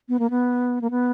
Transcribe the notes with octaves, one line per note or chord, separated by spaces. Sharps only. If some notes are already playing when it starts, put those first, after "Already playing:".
B3
A#3
B3
A#3
B3